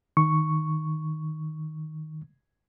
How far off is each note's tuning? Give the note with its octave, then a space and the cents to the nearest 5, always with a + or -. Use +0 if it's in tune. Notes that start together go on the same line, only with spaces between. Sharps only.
D#3 +0 C#6 +0